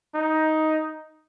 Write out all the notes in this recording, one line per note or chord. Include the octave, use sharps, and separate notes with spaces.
D#4